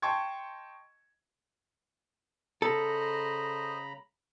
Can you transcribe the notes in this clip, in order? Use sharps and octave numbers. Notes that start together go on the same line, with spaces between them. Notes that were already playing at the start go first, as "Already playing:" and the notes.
D#5 G5 A5 C6 C#6 G#6
C#3 A4 C5 D#5 A#5 B5